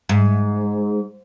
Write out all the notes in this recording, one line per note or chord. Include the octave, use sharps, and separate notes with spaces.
G#2